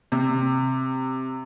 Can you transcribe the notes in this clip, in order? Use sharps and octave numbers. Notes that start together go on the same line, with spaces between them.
C3